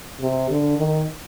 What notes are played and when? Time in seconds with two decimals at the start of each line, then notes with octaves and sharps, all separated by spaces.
0.20 C3
0.50 D3
0.78 D#3